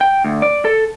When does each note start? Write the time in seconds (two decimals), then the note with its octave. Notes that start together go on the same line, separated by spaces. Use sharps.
0.01 G5
0.24 D2
0.42 D5
0.65 A4